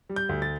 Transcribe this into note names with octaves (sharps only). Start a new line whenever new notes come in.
G3
G6
D2
A6